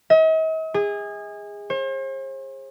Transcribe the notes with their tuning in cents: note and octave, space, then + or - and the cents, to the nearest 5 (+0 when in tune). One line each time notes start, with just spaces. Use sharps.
D#5 +45
G#4 -25
C5 +45